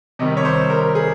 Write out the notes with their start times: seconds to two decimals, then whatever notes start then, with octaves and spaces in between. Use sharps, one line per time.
0.19 C3 D#3 G3 D#5
0.37 C#5
0.45 C5
0.70 A#4
0.95 G#4